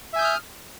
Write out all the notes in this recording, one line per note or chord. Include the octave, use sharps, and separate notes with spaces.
E5 G#5 D#6 F6 G6